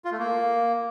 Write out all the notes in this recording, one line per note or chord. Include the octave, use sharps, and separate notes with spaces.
F4
A3
A#3